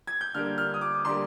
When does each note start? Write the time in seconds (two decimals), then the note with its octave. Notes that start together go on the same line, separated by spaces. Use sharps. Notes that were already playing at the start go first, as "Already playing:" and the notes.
0.07 G#6
0.21 G6
0.34 D3 G3 A#3 F6
0.58 F6
0.74 D#6
0.81 D6
1.05 D3 G3 A#3 C6